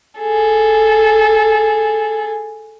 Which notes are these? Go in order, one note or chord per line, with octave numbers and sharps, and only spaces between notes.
G#4 A4